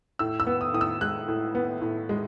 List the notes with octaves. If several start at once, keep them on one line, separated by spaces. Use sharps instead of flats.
A2 E6
E6
B3
D#6
A2 D#6
E6
G#3 F#6
A2
B3
A2
G#3